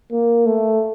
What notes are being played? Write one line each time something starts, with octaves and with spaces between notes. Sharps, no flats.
A#3
A3